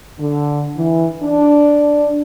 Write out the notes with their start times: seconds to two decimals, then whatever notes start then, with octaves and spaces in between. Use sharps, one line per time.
0.20 D3
0.77 E3
1.22 D4